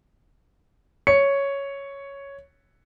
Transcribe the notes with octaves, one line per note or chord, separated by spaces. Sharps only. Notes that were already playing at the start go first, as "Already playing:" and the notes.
C#5 C#7